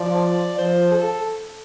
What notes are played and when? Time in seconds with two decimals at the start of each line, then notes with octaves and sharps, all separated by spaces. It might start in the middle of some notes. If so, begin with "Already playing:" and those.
Already playing: F3 D5
0.59 F3 C5
0.91 A4